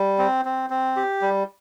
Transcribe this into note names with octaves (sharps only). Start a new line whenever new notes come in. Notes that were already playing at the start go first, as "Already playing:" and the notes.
Already playing: G3
C4
C4
C4
G4
G3